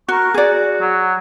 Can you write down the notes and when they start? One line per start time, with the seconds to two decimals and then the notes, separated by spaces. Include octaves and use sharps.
0.08 F#4 A#4 C#6 F#6
0.34 F#4 G#4 D5
0.81 F#3